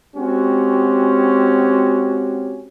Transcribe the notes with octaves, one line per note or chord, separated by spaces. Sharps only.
G#3 C4 C#4 F#4 G4